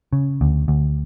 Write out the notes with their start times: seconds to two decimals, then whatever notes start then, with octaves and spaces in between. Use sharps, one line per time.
0.13 C#3
0.41 D2
0.68 D2